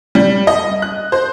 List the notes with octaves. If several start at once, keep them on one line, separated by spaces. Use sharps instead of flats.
G3
D#5
F#6
C5